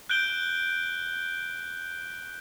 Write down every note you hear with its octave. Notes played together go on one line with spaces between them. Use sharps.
F#6 G6 D7 G7